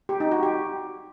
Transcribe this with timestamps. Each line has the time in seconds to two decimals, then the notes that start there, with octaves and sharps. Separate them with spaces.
0.09 G4
0.20 D#4
0.32 F#4
0.43 G4